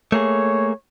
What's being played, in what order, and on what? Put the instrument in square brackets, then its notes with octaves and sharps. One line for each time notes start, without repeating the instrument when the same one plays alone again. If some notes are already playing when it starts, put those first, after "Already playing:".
[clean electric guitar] A3 A#3 G#4 [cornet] C#5